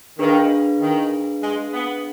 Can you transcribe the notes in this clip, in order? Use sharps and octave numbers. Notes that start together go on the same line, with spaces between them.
D#3 D4 G#4 B4 F5
D#3
G#3
B3